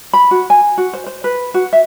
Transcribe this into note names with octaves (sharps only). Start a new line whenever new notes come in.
B5
F#4
G#5
F#4
C5
C5
B4
F#4
E5